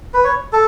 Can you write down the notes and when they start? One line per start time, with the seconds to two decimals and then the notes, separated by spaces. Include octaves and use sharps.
0.14 B4
0.24 C#5
0.53 A4